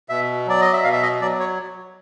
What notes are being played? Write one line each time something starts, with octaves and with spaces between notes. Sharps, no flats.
B2 E5
F#3 D5
D#5
E5
B2 F5
E5
D#5
F#3 D5
C#5